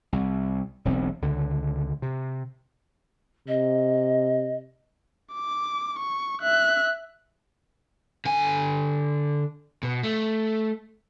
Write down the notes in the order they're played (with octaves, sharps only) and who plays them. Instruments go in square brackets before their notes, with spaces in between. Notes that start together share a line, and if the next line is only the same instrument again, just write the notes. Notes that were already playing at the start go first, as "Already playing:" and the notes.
[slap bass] C2
E1 B1 C4
C#2 D3
C3
[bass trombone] C3 [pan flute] D#5
[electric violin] D6
C#6
E5 F#6
[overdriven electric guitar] D3 G#5
B2
A3